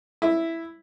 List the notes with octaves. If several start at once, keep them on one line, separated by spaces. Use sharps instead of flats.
E4